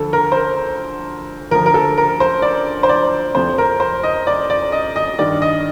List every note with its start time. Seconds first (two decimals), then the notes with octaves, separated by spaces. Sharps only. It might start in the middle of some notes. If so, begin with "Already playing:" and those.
Already playing: D2 D3 F3 A4
0.13 A#4
0.32 C5
0.36 A#4
1.51 D2 D3 F3 A#4
1.66 A#4
1.74 A4
1.98 A#4
2.20 C5
2.42 D5
2.83 C5
2.89 D5
3.34 F2 C3 F3 C5
3.58 A#4
3.80 C5
4.03 D#5
4.27 D5
4.50 D5
4.72 D#5
4.96 D#5
5.18 G2 D#3 D5
5.42 D#5